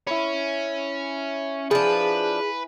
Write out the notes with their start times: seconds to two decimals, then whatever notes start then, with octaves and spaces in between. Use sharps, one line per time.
0.07 C#4 E4 B5
1.71 F3 D4 G#4 B4 G#5